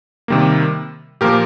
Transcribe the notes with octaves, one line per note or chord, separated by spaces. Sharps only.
C3 D#3 G3 A#3
A#2 F3 A#3 G4 A#4